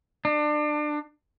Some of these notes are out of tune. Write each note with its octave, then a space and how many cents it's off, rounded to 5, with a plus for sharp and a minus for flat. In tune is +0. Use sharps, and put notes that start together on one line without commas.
D4 +25